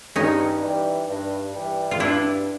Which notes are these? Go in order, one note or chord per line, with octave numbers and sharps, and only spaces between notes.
G2 C#4 D#4
E3 G3
G2
E3 G3
F4
G2 D4 E4